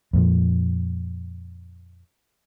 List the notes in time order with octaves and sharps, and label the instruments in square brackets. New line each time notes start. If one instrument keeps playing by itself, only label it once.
[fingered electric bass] F2 A#2 F3